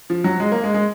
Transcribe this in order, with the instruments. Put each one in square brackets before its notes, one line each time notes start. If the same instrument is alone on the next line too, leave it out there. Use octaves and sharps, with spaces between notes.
[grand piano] F3
F#3
G#3
A#3
G#3
G#3